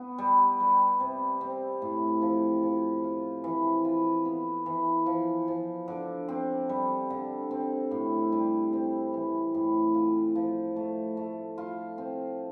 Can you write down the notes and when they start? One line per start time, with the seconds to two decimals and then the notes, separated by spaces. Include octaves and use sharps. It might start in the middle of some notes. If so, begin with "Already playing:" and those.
Already playing: B3
0.18 G3
0.60 G3
1.00 C3
1.41 C4
1.82 A2
2.22 F3
2.63 F3
3.04 F4
3.44 E3
3.85 F4
4.25 B3
4.66 E3
5.06 F3
5.48 F3
5.88 D3
6.28 C4
6.69 G3
7.10 D3
7.51 C4
7.91 A2
8.32 G3
8.73 C4
9.14 E3
9.54 A2
9.94 F4
10.35 F3
10.76 A3
11.17 A3
11.58 F4
11.98 C4